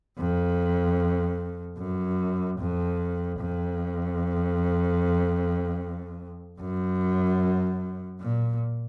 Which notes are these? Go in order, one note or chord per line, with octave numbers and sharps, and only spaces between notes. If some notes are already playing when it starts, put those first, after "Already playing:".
F2
F#2
F2
F2
F#2
A#2